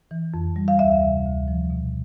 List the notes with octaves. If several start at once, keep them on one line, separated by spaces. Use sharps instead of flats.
E3
F2
G3
F5
D2 E5
C3
D2
F3
B2